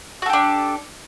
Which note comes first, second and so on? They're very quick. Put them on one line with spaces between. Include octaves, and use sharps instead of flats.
F#4 A4 G4 D4